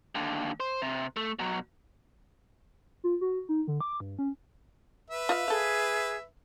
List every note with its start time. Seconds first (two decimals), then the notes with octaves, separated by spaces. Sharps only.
0.15 D#2 D3
0.60 C5
0.82 C3
1.17 A3
1.39 B2 F#3
3.04 F4
3.21 F#4
3.49 D#4
3.67 D3
3.81 D6
4.00 G2
4.19 C#4
5.11 B4 E5
5.29 F4 D#5 F5
5.48 G#4 A4 F5